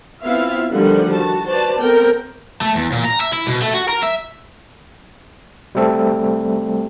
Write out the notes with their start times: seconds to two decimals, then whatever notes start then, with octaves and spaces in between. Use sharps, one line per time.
0.23 B3 C4 E4 F4 E5 F5
0.71 D3 D#3 F3 G3 A3 F#5
1.13 F#4 A5
1.46 F#4 B4 C5 D5 A5
1.79 B3 C4 A4 A#4 G5
2.61 A3
2.75 E2
2.92 A#2
3.05 A#5
3.21 E5
3.33 E4
3.47 B2
3.62 A3
3.74 F#4
3.89 A#4
4.03 E5
5.75 G3 A3 C4 A4